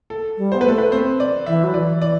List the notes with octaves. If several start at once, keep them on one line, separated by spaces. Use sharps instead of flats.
A4
G3
B3 C5
B4
A3 A4
B4
C4 C5
D5
E3 E5
F#3
E3 D5
D5